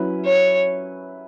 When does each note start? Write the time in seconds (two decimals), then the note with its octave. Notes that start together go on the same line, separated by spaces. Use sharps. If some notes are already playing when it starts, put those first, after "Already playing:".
Already playing: F#3 C#4 E4 B4
0.26 C#5